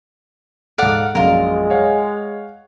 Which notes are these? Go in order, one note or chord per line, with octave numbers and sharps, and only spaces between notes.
G#2 A4 D5 F5 F#5
A#1 F#2 G#3 F4 A#4
C#5 F5 F#5